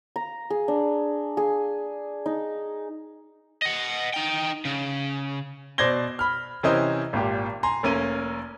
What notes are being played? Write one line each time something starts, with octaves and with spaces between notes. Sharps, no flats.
A#5
G#4
D4
G#4
D#4
D#5 F#5
D#4 G5
C#3
B2 C5 D5 G#6 A#6 G7
B5 F6
C3 E3 C#4 A#4 C5 D#5
G#1 A#2 G4
G#5 A#5 C6
F1 A#3 C#4 A#4 D#7